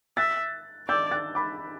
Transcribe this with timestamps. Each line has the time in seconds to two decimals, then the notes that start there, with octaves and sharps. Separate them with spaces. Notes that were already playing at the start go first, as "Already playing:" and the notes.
0.17 E5 F#6 A6
0.88 D5 E6 G6
1.11 F#6 A6
1.35 B5 D6